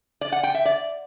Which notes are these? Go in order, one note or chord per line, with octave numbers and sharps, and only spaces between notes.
D5
F#5
G5
E5
D5